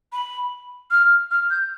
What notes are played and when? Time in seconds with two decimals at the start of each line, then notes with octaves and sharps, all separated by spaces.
0.13 B5
0.91 F6
1.31 F6
1.50 G6